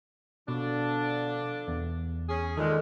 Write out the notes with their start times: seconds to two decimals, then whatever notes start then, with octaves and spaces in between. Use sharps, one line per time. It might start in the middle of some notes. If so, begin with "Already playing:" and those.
0.48 B2 D3 F3 D4
1.68 E2
2.28 C#4 G#4
2.57 A#2 D#3 G#3 A4